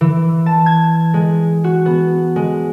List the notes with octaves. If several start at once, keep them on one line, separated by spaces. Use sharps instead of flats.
E3
A5
G#6
G#3
F#4
B3
G#3